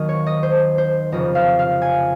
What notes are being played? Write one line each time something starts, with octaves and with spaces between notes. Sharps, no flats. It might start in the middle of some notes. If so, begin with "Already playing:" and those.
Already playing: D#2 D#3 F#3 D#5
C#5
D#5
C5
C5
F1 F2 C#3 F3 D#5
F5
F5
G#5